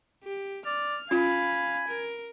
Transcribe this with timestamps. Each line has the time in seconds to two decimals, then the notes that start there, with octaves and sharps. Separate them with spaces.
0.24 G4
0.66 D5 F6
1.11 C#4 F4 F5 G#5 B5
1.88 A#4